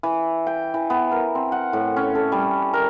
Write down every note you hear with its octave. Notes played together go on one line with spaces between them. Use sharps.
E3
G5
E3
B3
A#4
C4
F#5
A2
C#4
A4
G3
A#4